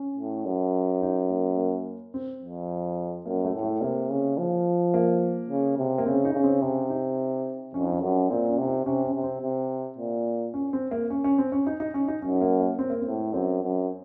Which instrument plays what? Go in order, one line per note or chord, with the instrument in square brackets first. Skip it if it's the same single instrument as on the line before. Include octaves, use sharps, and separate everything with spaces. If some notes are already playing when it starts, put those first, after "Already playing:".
Already playing: [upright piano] C#4
[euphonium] A2
F#2
[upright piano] D#4
A#3
A#3
C4
[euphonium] F2
[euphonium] F#2 [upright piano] A#3
[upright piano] A3
[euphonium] A2
[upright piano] A3
[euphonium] C3 [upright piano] A#3
[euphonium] C#3
F3
[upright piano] A#3
[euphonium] C#3
C3
[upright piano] A#3
[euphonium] C#3 [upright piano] C4
[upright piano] D#4
[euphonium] C#3
[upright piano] C4
[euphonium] C3 [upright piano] C#4
[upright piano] D#4
[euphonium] F2 [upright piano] C#4
[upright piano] D#4
C#4
[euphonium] F#2
[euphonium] A#2 [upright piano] C4
[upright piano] C#4
[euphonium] C3
[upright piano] D#4
[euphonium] C3 [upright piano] C#4
[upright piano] C#4
[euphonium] C3
[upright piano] C4
[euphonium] C3
A#2
[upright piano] C#4
C4
A#3
C#4
C#4
C4
C#4
D#4
D#4
C#4
D#4
[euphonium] F#2 [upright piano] C#4
[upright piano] A#3
A#3
C4
A#3
C4
[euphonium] A2
[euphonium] F#2 [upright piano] C4
[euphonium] F#2